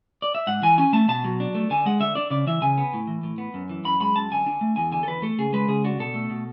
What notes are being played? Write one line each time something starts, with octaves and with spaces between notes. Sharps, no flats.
D5
E5
G#2 F#5
E3 G#5
C#4 G#5
A3 A5
B2 A5
F#3
D4
A3
D3 G#5
G#3 F#5
D3 E5
D4 D5
C#3 D5
E3 E5
C#3 G#5
B3
A2
E3
A2
B3
F#2
E3
F#2 B5
G#3 B5
F#2 A5
D3 G#5
D4
A3
E2 G#5
D3 G#5
A4
E2 B4
A3 A4
C#3 G#4
G#3 B4
C#3 G#4
D4 F#4
B2 A4
A3
B2